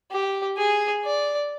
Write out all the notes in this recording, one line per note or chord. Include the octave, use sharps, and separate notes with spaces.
G4
G#4
D5